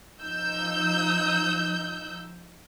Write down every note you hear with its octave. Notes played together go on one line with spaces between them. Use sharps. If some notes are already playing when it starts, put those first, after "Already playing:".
F3 D#4 E6 G6